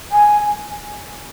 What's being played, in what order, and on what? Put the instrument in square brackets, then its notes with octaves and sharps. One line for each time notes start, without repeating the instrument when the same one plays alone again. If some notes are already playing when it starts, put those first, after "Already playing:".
[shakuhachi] G#5